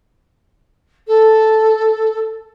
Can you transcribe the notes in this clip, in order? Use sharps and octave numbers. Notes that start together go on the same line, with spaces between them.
A4